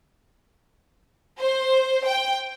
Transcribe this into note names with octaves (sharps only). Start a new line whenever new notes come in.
C5
G5